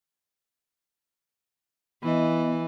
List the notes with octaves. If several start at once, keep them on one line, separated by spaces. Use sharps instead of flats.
E3 B3 D#5